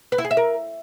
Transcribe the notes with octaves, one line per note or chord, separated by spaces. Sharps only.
B4
E4
G#4
E5
A#4